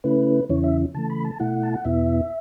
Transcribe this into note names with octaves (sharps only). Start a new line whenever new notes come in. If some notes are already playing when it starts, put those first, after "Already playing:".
C#3 A3 C#4 E4 B4
E2 C#3 E3 C#4 E4 C#5
E5
C#3 E3 A3 A5
B5
A5
B2 A3 E4 F#5
A5
F#5
E2 B2 B3 E4 E5